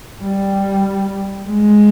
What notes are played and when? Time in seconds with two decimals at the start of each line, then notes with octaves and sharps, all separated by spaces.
0.23 G3
1.48 G#3